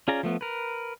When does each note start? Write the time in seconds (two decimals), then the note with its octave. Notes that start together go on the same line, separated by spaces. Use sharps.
0.08 C#4 F4 G#4 D5 A#5
0.23 F3 A3 B3
0.41 A#4 B4